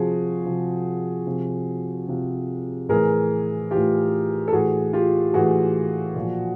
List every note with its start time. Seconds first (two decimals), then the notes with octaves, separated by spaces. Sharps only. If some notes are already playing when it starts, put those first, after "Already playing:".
Already playing: C3 F3 F#4 G#4
0.45 C3 F3
1.26 C3 F3
2.08 C3 F3
2.89 A2 E3 G#4 A#4
3.71 A2 E3 F4 G4
4.48 A4
4.52 A2 E3 F#4 G#4
4.93 F4 G4
5.33 A2 E3 F#4 G#4
6.16 A#2 F3